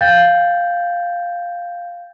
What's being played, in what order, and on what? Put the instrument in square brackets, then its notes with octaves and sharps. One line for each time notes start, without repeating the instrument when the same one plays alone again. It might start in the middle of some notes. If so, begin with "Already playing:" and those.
[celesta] F5 G5 G6 A6